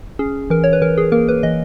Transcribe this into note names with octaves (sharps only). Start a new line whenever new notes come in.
C#4 G#4
E3 A#4
C#5
B4
E3 A#4
G#4
A#3 A#4
B4
E3 D#5